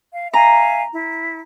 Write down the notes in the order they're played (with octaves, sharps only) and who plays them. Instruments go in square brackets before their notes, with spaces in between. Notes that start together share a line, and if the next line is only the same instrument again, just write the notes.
[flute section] F5
[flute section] E5 F5 G#5 [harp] A#5
[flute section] E4